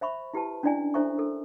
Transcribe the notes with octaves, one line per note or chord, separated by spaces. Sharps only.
C5 E5 B5 C#6
E4 G4 B4 A5
C#4 D4 E4 D5 D#5 G#5
D4 A4 C5 E5 A#5 C#6
A4 A#4